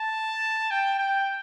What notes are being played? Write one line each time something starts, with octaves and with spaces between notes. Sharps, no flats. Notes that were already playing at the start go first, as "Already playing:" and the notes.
Already playing: A5
G5
G5